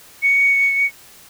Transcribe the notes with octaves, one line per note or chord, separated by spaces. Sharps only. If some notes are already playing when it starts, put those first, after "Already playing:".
C#7